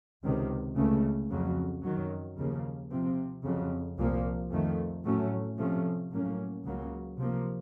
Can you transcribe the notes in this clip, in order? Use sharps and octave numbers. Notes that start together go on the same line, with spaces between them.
C#2 C3 D#3
C#2 C#3 A3
F2 C#3 F#3
F#2 D#3 F#3
D#2 C#3 F3 A#3
C3 F3 C4
F2 C#3 F#3
C2 A#2 F3 A#3
F2 D#3 A3
A2 F#3 A3 C#4
C3 F3 A3 C#4
A2 F#3 A#3 C#4
C#2 C#3 F#3 A#3
C3 F3 A#3